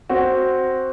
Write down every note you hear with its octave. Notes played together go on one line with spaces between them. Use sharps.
C4 F#4